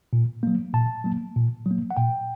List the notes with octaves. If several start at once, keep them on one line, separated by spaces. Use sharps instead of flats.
A#2
F#3 A#3
A#2 A5
F#3 A#3
A#2
F#3 A#3
F#5
A#2 G5